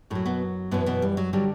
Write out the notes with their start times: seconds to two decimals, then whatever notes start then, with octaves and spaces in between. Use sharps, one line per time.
0.10 F#2 A2 F#3 A3
0.26 B2 B3
0.71 F#2 B2 E3 B3
0.86 B2 B3
1.02 G3
1.17 F#3
1.33 D3 F#3 G3